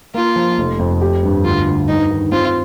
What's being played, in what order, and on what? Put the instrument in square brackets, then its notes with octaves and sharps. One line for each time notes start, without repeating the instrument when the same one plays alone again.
[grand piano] A#3 [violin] F4
[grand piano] F3
F1
F2
G4
G2
[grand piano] D2 [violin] F4
[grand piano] D2
[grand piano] G2 [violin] D#4
[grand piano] D#3
[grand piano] C4 [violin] F4